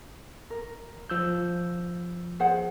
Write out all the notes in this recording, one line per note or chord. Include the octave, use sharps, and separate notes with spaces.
A#4
F3 E6 G6
G#4 C5 F#5